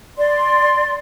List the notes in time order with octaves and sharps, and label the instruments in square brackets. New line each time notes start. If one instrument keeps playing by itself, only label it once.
[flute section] D5 C6